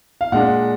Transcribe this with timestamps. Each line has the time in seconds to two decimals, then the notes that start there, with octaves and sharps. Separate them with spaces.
0.21 F5
0.32 A#2 G#3 D4 F#5